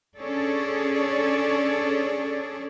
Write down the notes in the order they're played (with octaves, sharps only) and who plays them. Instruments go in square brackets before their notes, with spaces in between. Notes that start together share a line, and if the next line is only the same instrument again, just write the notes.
[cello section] C#4 D4 G#4 A4 C#5 D5